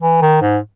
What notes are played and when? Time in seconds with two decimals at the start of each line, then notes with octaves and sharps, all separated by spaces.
0.02 E3
0.22 D#3
0.42 G#2